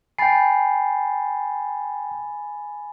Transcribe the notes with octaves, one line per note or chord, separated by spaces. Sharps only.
G5 G#5 B5 A6 C7